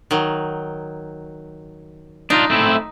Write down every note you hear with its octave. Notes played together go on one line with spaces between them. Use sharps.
D#3 F#3
D4 D#4 F4
A3 C4 E4